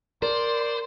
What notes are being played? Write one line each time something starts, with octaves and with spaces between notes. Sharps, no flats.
A#4 C5 D5 C6